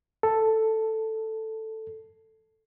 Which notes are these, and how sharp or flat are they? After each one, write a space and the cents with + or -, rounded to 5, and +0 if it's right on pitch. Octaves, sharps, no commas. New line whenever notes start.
A4 +5